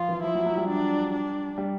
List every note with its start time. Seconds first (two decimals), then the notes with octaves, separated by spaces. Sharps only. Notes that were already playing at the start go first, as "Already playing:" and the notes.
Already playing: F3 F4
0.09 E3
0.23 F3 E4
0.35 F#3
0.46 F#3
0.57 G3
0.68 D4
1.13 D4
1.58 G3